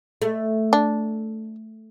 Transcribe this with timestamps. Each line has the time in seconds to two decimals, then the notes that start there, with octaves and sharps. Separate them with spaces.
0.22 A3
0.73 D4